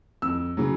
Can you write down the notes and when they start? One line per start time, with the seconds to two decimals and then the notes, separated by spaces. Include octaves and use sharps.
0.22 F2 E6
0.57 C#3 F#3